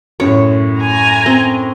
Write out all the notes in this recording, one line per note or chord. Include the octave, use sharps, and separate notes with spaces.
F#2 A2 C#5
G#5 A#5
C4